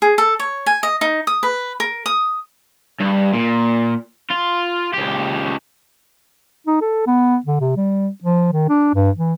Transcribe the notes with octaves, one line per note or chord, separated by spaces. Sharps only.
G#4
A4
C#5
G#5
D#5
D#4
D#6
B4
A#4
D#6
G2
A#2
F4
C#2 G4
D#4
A4
B3
D3
C3
G3
F3
D#3
D4
G2
E3